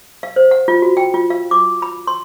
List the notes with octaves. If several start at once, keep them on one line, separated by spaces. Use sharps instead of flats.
F5
C5
F#5
F4
F#4
G5
F4
F5
D6
B5
C6